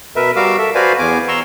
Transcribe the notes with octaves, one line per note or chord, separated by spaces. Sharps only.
B2 A#4 B4 E5
G3 F#4 A#4 F5 D6 E6
A4 E5
F#4 B4 C5 D5 F5 G#5
E2 B3 G#5 D6
A#5 C6 C#6 E6